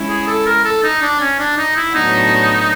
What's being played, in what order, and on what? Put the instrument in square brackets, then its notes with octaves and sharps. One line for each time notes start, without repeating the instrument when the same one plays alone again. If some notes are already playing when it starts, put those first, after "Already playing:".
Already playing: [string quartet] G#3 C#4 E4
[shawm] G#4
A4
A#4
A4
D#4
D4
C#4
D4
D#4
E4
[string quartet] A2 F#3 B3 D4 F#4 [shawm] D#4